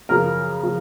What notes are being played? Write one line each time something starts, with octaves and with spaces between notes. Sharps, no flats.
F#2 C#3 F3 A#4
C#3 F3